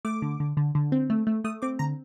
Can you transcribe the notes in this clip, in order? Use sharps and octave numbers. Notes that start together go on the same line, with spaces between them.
A3 D6
D3
D3
D3
D3
C4
A3
A3
A3 D#6
C4 D6
D3 A#5